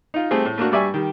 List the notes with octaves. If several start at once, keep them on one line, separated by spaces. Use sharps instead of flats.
D#4 F4
G3 A3 C4 G4 G#4
A2
A3 A#3 D4 F#4
G2 G3 D5 E5 G#5 C#6
D#3 G3